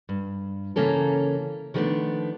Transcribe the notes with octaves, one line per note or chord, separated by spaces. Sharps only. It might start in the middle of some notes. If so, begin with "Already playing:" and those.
G2
C#3 E3 A#3 C#4 A4 A#4
D#3 F3 G3 A3 B3 D4